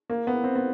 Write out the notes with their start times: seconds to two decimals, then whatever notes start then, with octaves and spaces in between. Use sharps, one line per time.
0.10 A#3
0.27 B3
0.44 C4
0.56 B3